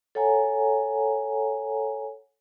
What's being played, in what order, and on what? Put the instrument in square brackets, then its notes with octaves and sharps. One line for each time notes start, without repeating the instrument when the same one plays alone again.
[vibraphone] A4 C#5 F#5 G#5 A#5